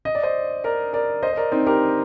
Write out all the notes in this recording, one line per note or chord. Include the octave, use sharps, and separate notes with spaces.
D#5
D5
C5 D#5
A#4 D5
A#4 D5
C5 D#5
C5
A#4 D5
C4 D#4
G4 A#4